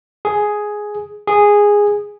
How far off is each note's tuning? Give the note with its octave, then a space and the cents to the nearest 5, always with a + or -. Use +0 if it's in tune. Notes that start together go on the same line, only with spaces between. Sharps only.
G#4 +5
G#4 -10